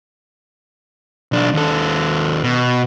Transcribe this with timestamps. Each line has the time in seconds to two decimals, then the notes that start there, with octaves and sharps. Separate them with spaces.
1.32 B1 D4
1.53 D#2 A4
2.43 B2